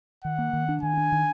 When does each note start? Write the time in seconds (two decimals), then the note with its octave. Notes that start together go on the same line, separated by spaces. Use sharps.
0.24 D#3 F#5
0.38 A#3
0.53 D#3
0.69 D4
0.83 D#3 G#5
0.97 D4
1.12 D#3